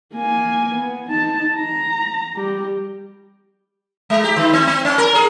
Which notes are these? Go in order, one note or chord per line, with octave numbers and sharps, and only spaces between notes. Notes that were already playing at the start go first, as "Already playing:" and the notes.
A#3 G#5
B3
D#4 A5
A#5
G3 G4
G#3
G4
D#3
C4
C4
C#4
A#4
G#4